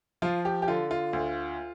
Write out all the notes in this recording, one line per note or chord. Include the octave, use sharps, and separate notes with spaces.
F3 F4
G4
G4
D3 F4
F4
D2